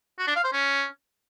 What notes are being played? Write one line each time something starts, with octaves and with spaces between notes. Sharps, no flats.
F#4
D4
F5
C5
C#4